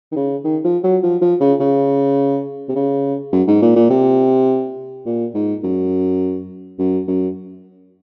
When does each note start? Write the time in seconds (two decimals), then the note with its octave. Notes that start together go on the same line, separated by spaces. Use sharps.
0.12 D#3
0.16 C#3
0.44 D#3
0.64 F3
0.83 F#3
1.03 F3
1.21 F3
1.40 C#3
1.60 C#3
2.69 C3
2.75 C#3
3.32 F#2
3.47 G#2
3.62 A#2
3.76 A#2
3.90 C3
5.06 A#2
5.34 G#2
5.63 F#2
6.79 F#2
7.07 F#2